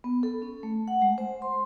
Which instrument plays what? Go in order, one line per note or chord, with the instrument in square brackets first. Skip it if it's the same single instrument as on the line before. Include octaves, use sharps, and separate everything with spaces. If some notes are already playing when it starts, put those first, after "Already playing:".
[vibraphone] B3
A4
C#4
A3
F#5
G#3
C5
C6